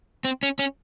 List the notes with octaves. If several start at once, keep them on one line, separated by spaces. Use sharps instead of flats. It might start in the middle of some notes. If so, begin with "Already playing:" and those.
C4
C#4
C#4